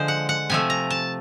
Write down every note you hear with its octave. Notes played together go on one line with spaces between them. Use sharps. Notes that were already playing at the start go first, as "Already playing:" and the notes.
Already playing: D3 F3 G#3 C5
F#5
F#5
C3 F3 A3 G#5
A#5
A5